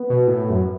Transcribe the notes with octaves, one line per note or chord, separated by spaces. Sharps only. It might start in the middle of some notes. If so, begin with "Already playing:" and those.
Already playing: B3
B2
A2
F#2